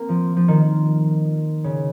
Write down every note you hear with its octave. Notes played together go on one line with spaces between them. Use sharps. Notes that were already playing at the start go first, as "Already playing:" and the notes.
Already playing: A#3 C4
F3
F3
D#3
C#3